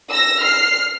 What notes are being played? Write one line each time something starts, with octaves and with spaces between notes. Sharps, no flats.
E6 A#6
F6 C7